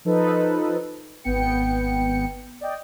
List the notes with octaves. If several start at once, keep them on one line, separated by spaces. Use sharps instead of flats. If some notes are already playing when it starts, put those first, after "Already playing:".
F3 D#4 A4 B4
G#1 B3 G5 C#7
D5 D#5 G5